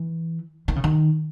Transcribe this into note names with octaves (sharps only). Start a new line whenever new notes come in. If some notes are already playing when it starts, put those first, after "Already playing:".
Already playing: E3
D#3
C#3
D#3